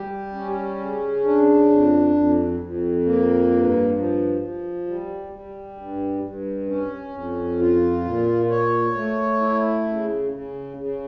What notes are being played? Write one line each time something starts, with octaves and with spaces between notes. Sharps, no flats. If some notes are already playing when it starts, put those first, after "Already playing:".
Already playing: G3 G4
C#4
C#3
D4
F2
F2
F2
A#3
G2
F3
F3
G3
G3
G2
G2
C#4
F2
F4
A#2
C#5
A3
E4
C#3
C#3
C#3